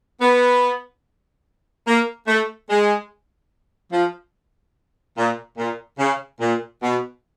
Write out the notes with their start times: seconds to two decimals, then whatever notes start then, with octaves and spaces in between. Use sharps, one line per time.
0.21 B3
1.87 A#3
2.28 A3
2.70 G#3
3.93 F3
5.18 A#2
5.58 A#2
5.99 C#3
6.41 A#2
6.83 B2